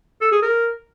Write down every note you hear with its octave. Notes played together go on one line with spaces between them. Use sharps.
A4
G#4
A#4